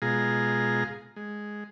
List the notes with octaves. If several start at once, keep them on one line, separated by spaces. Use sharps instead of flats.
B2 G#3 F4 G#4 A#5
G#3